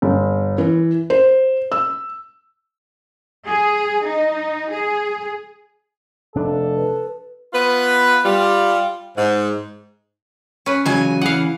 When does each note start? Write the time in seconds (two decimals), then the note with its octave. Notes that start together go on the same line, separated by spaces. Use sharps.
0.02 G1
0.58 E3
1.10 C5
1.72 E6
3.47 G#4
4.06 D#4
4.72 G#4
6.35 F1 D4 A4
6.76 B4
7.53 B3 F4 B4
8.25 G3 F4
9.17 G#2
10.66 C#4 B4
10.86 E2 C#3 F#3 G#5
11.21 E3 F5 F#5